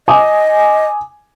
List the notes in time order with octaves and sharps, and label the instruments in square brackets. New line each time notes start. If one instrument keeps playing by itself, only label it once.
[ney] D#5 [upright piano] G#5 D6 D#6